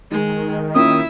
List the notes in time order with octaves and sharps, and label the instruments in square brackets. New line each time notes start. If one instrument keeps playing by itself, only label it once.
[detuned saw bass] D#3 [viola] G#3
[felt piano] A#3 C#4 F4 [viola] E4 E5 [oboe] D#6